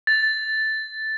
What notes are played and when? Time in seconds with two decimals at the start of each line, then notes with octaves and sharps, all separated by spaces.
0.07 A6